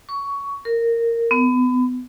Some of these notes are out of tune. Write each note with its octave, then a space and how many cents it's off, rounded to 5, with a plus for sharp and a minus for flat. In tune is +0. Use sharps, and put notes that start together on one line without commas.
C#6 +15
A#4 -10
B3 +30